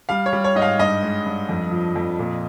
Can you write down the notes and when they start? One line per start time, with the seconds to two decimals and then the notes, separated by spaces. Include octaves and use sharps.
0.09 G3 F5
0.26 C#5
0.33 G3
0.44 C#5
0.55 G#2 D#5
0.62 F5
0.79 G2 D#5
1.03 G#3
1.26 G2
1.49 F2
1.71 F3
1.95 F2
2.19 A#2